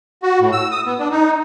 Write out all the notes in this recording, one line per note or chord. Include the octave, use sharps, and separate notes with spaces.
F#4
A2
E6
D#6
B3
D4
D#4